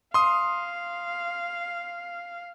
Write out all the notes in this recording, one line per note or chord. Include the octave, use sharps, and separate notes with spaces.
F5 C6 D#6